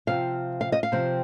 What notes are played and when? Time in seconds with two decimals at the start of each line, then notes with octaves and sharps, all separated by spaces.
0.07 C3 F3 C4 F5
0.61 F5
0.72 D#5
0.83 F5
0.92 C3 F3 C4